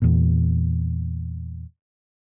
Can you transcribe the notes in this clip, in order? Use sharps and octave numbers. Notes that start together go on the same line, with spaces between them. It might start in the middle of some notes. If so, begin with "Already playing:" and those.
E2 A#2